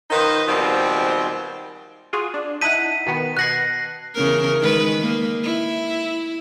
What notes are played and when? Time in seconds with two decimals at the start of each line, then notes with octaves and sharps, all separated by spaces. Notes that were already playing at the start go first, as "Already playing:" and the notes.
0.11 D#3 D#4 F4 B4 C5 D#5
0.48 B2 D#3 F3 G3 G#3 C4
2.13 F4 F#4 G#4
2.34 D4
2.61 D#4 E4 F#5 A5 B6 D#7
3.06 B2 D#3 B3
3.37 B2 F#5 F#6 G#6 A#6 C7
4.15 E2 C#3 A#4
4.61 D#3 G#3 B4
5.00 G#3 A#3
5.44 E4